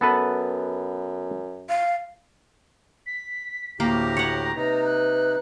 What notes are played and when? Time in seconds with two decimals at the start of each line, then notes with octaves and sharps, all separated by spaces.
0.01 F#2 B3 A4 B4
1.69 F5
3.06 B6
3.80 D2 A2 A#3 G4 A#5
4.17 C#5 F#5
4.56 C3 D#4 B4
4.86 F#6